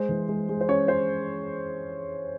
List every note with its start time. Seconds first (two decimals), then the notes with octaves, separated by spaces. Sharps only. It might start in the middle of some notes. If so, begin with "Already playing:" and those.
Already playing: G#3 C5
0.09 E3
0.29 G#3
0.49 G#3
0.61 C5
0.69 C#4 C#5
0.88 C#4 C5